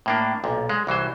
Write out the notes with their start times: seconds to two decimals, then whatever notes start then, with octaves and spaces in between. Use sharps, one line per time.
0.06 A2 A#3 D4
0.44 B1 A#2
0.69 G#3
0.87 C2 E3 F#3 C5